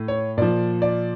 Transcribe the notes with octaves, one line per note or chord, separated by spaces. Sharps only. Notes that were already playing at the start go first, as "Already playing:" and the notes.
Already playing: A2
C#5
A#2 F3 D5
D5